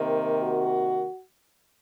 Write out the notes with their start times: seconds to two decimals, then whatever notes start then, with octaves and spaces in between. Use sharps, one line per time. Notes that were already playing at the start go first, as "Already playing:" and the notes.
Already playing: C3 D#3 A#3
0.40 F#4